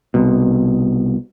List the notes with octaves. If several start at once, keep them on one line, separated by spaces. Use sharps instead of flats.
C2 B2